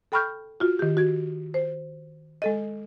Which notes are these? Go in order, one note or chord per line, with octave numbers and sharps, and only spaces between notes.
A4 G5 B5 C#6 F6 G6
F4 F#4
D#3 G4
F#4 G#6
C5
G#3 A4 D#5